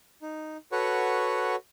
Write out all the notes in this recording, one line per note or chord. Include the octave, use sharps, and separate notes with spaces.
D#4
F#4 A4 B4 C#5 F#5 C#6